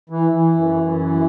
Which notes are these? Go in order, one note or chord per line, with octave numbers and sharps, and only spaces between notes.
E3
E3
F#2
F#2
E3